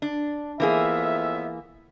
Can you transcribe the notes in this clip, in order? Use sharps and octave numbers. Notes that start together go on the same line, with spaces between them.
D4
F2 E3 A#3 B3 G#4 E5